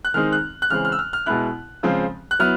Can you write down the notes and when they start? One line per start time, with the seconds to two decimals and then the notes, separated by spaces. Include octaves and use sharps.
0.05 F#6
0.14 D#3 G#3 C4 D#4 F6
0.32 F#6
0.62 F#6
0.70 C#3 E3 G#3 C4 F6
0.85 F6
0.92 E6
0.99 F6
1.13 F6
1.26 B2 G#3 B3 E4 F#6
1.83 C#3 F3 G#3 C4
2.31 F#6
2.39 F#3 B3 E4 F6